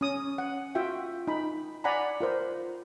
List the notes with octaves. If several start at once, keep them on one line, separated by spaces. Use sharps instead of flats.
C#4 D#6
F#5
F4 F#4 E5 G5
D#4 B5
D5 F#5 G#5 A#5 B5
F4 A#4 C5